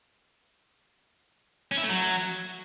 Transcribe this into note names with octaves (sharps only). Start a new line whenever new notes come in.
C#4
E4
A3
F#3